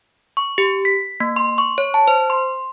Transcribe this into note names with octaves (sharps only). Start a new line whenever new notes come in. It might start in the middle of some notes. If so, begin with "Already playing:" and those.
C#6
G4
B6
A#3
C6
C#6
C#5
A5
C5
C6